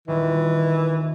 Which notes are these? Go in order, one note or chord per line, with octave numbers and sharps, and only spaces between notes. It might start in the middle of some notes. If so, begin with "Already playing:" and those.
D#1 D#3 E3